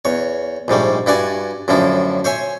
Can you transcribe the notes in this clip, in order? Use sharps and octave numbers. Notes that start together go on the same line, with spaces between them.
E2 C#5
A#1 G#2 G3 A3
G2 E4 F#4 D5 G#5
F#2 A2 D3 F3 E4
C5 C#5 E5 G#5